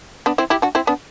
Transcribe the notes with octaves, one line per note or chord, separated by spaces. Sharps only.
B3 D4
C4 E4
E4 G4
D4 F#4
C4 E4
B3 D4